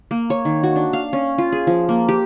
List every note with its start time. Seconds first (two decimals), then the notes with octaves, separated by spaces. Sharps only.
0.11 A#3
0.30 C#5
0.45 D#3
0.63 F#4
0.76 D4
0.93 F5
1.13 C#4
1.38 F4
1.52 G#4
1.67 F3
1.89 A#3
2.09 G4